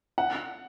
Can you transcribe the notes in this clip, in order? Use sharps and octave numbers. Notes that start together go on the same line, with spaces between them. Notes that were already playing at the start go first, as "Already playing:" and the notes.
F#5